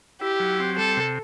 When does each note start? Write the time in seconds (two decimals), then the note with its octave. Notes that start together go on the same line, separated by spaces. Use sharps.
0.21 E4 G4
0.40 F#3
0.59 C4
0.78 G3 A4
0.97 C3